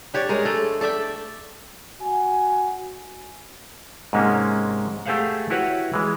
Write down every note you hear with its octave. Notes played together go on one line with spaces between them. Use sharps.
D4 G4 C#5 D5
G#3 A#4
A3 A4
A4 D5 E5 G5
F#4 G#5
G#2 C3 G#3 A#3 C#4
A3 G4 G#4 C5 F5 F#5
E4 F#4 G4 B4 C#5 F#5
E3 G#3